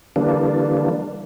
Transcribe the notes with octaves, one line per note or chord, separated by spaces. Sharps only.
D3 E3 G3 A#3 D4